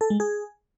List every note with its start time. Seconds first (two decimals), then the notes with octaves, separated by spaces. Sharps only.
0.01 A4
0.10 G#3
0.20 G#4